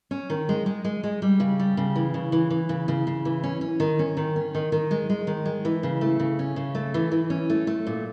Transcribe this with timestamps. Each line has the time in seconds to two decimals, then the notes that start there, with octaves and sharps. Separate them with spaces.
0.11 C#4
0.30 D#3
0.49 G#3
0.66 G#3
0.84 G#3
1.03 G#3
1.22 G3
1.40 C#3
1.59 G3
1.77 C#3
1.96 E3
2.14 C#3
2.32 E3
2.50 E3
2.69 C#3
2.88 C#3
3.07 C#3
3.25 E3
3.44 C#4
3.61 C#4
3.80 D#3
3.99 C#4
4.17 D#3
4.36 C#4
4.55 D#3
4.72 D#3
4.91 G#3
5.10 G#3
5.27 D#3
5.46 G#3
5.65 E3
5.83 C#3
6.01 A3
6.19 C#3
6.39 C#4
6.56 C#3
6.75 A3
6.94 E3
7.12 E3
7.30 C#4
7.50 A3
7.67 A3
7.87 A#2